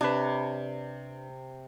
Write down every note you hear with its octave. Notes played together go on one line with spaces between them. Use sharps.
C3 D4 B4 C#5